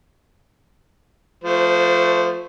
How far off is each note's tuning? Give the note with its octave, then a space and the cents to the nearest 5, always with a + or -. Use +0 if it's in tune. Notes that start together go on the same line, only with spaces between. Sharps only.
F3 +10 A3 +0 C5 -25